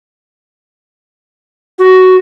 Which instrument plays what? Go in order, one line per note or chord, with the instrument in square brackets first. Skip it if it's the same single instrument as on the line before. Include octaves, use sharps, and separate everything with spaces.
[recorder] F#4